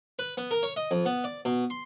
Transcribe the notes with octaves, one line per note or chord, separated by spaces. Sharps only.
B4
B3
A#4
C#5
D#5
F2
B3
D5
B2
C6